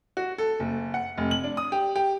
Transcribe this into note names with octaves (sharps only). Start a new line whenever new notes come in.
F#4
A4
F#1
F#5
F1
F#7
D4
D#6
G4
G4